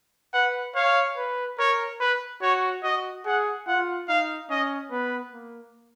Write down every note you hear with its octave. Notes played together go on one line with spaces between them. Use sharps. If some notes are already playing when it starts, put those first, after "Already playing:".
B4 F#5
C#5 F5
B4
A#4 C#5
B4
F#4 C#5
F#4 D#5
G#4 F#5
F4 F#5
D#4 F5
C#4 D#5
B3 B4
A#3